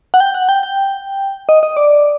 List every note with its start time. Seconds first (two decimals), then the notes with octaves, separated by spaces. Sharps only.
0.14 F#5
0.20 G5
0.34 F#5
0.49 G5
0.63 G5
1.49 D#5
1.63 D#5
1.77 D5